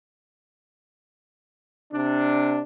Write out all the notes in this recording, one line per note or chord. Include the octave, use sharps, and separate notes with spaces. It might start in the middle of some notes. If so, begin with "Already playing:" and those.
C3 D4